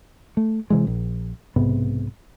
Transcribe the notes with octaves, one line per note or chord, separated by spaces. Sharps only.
A3
C3 E3 G#3
A#1
B1 G#2 C3 B3